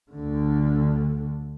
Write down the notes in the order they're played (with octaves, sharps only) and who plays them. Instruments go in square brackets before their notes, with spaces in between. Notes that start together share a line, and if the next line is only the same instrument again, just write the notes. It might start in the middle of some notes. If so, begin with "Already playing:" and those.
[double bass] D2 D3